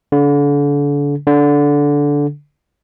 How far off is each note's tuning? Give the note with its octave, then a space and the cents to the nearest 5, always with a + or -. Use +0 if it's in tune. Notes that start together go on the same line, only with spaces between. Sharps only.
D3 -35
D3 -15